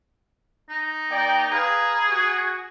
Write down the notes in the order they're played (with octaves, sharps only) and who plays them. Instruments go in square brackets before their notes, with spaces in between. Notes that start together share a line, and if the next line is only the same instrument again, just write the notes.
[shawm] D#4
[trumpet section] A#3 D5 G5
[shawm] G#4 [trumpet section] B4 F5 A#5
[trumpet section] F#4